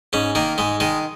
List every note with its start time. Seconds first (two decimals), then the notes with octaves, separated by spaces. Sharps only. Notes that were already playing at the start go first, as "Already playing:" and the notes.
0.13 G#2 C#4
0.35 D#3 A#3
0.58 G#2 G#3
0.80 D#3 G#3